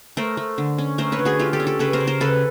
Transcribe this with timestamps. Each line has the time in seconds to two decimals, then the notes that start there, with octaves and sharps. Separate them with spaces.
0.17 A3 A#4 C5
0.37 A3
0.58 D3
0.78 C#4
0.98 A3 A#4 C5
1.12 B4 C#5
1.19 D3
1.25 F#4 G#4
1.39 A3 F4 G4
1.53 G4 A4
1.60 C#4
1.67 G4 A4
1.79 C#3 A4 B4
1.93 A#4 C5
2.00 C#3
2.07 A#4 C5
2.20 C#3 A4 B4